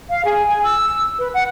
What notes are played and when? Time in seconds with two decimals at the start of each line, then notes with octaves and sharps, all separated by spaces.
0.09 F5
0.25 G#4
0.49 G#5
0.63 E6
1.18 B4
1.34 F#5